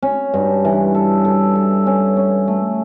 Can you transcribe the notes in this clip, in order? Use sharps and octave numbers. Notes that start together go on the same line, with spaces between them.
C#4
G2
E3
A4
A4
A4
C#4
C#4
A3